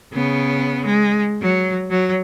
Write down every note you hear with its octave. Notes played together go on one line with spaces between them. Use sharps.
C#3 B3
G#3
F#3
F#3